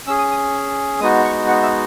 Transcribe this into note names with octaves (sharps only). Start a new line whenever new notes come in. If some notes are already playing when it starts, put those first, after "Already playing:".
C#4 G#4 E6
D#6
D#6
G#3 B3 D#4 F#4 D#6
C#6
F#5
E5